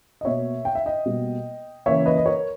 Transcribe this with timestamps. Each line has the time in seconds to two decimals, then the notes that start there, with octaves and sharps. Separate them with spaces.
0.21 D#5
0.25 B2 A#3 C#5 E5
0.65 G5
0.75 E5
0.86 D#5 G5
1.06 B2 G3 A#3
1.86 C#3 E3 A#3 C#5 E5
2.06 B4 D#5
2.17 D#5
2.26 A#4 C#5